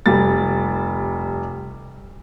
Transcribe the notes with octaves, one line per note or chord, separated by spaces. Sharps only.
F1 G3 A6